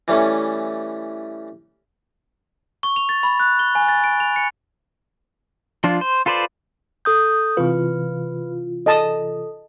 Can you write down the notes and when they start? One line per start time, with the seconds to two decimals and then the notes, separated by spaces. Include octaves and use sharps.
0.08 E3 G3 A3 C#4
2.83 C#6
2.96 F7
3.09 A6
3.23 B5
3.40 F#6
3.59 G7
3.75 G#5
3.88 A6
4.04 D7
4.20 F7
4.36 C#7
5.84 F3 D4 F4
6.01 C5
6.26 F4 A4 B4 C5 D5
7.05 A4 D#6 G6
7.57 C3 E3 F4 B4
8.86 A4 D#5 A5 D#6